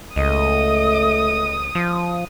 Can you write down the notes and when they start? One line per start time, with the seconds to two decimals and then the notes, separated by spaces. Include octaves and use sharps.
0.16 C#2 A3 D#5 D#6
1.75 F3